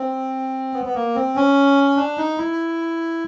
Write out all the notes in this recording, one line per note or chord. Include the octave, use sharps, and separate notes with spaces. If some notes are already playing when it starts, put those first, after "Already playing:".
Already playing: C4
B3
B3
A#3
C4
C#4
D4
D#4
E4